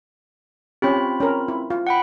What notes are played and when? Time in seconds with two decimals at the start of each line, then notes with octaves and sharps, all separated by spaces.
0.82 C4 C#4 F4 G4 B5
1.20 C#4 A#4
1.48 E4
1.70 F4
1.87 F#5 G5 B5